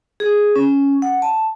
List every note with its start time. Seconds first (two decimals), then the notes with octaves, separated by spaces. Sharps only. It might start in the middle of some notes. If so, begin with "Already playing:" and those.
0.20 G#4
0.56 C#4
1.02 F#5
1.22 A5